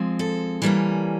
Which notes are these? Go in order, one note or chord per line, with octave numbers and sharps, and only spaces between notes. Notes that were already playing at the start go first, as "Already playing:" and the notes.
Already playing: F3 G#3 C4
A4
E3 G3 A#3 C#4